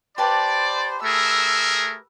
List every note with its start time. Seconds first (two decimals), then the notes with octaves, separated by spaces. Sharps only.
0.18 G4 B4 C5 D5 A5
1.03 A3 G#4 A#4 E6